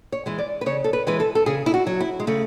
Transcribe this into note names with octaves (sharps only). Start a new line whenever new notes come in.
C#5
E3 G#3
D5
B4
C#3 C#5
A4
B4
E3 G#3 B4
A4
A4
C#3 G#4
E4
F#4
F#3
E4
G#3
C#3 A3